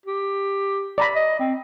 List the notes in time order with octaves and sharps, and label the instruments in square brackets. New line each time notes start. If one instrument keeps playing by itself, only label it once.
[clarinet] G4
[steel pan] D5 A#5 B5
[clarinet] D#5
C4